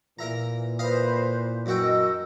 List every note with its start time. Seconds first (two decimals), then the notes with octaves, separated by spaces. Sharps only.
0.19 A#2 E3 A#4 E5 A#5
0.79 B4 C5 D#5 F5
1.66 F#2 F#4 A#4 D#5 G5 E6